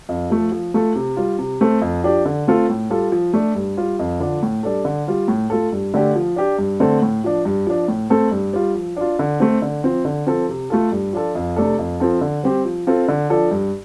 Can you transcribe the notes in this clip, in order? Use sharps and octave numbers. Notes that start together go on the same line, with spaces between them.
F2
F3 A3
F3
A3 F4 A4
C3
G3 F4
C3
A3 C4 A4
F2
F3 D4 G4
D3
A3 C4 F4 A4
A2
G3 F4 A4
F3
A3 D4
G2
G3 F4
F2
D3 F3 D4
A2
G3 D4 A4
D3
G3 F4
A2
A3 F4 A4
G2
D3 A3 D4 G4
F3
D4 G4
G2
D3 A3 C4 A4
A2
F3 D4
G2
F3 D4
A2
A3 C4 A4
G2
G3 F4
F3
D4 F4
D3
A3 C4
D3
F3 C4
D3
F3 C4 A4
C3
A3 F4 A4
G2
F3 D4 F4 A4
F2
C3 A3 D4 A4
F2
F3 C4 A4
D3
G3 C4 G4
F3
C4 F4 A4
D3
F3 D4 A4
G2